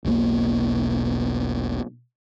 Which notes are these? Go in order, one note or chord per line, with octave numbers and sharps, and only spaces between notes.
E1 B1 B2 A#3